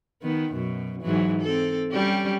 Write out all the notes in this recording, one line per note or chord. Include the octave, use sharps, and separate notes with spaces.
D#3 B3
F#2 B2
G#2 E3 F#3
C4 A4
G3 C#4 G4